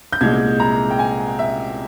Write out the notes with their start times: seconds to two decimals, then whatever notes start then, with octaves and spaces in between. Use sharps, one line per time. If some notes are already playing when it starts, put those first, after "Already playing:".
0.13 G6
0.21 C2 A#2 G#3 G#6
0.60 A#5
0.91 G5
0.99 G#5
1.39 E5